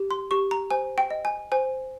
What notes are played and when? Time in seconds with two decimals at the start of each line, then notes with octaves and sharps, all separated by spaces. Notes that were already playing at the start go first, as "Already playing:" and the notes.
Already playing: G4
0.11 C6
0.31 G4 C#6
0.51 A#5
0.71 C5 G#5
0.98 G5
1.10 D#5
1.25 G#5
1.52 C5 G#5